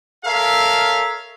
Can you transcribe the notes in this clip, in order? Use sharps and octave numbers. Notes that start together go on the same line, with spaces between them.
A4 A#4 C#5 E5 F5